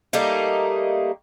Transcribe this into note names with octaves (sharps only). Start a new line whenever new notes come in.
G3 A3 A#3 D#4